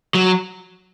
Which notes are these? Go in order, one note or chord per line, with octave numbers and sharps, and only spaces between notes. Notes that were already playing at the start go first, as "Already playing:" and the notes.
F#3